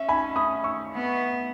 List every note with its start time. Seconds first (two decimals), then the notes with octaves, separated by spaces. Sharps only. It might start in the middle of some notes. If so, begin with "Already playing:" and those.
Already playing: C#4 E5
0.09 G#5 B5
0.36 B5 D#6
0.64 C#6 E6
0.91 B3